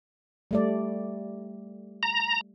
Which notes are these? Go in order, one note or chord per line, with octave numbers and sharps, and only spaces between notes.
G3 A3 D5
A#5